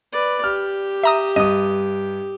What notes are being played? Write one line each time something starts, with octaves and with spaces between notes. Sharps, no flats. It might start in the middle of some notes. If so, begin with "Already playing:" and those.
B4 D5
G4 F6
E5 A#5 D#6
G2 D#5 D#6